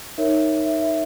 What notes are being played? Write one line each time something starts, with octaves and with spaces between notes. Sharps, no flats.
D#4 A#4 C#5 E5
E5
E5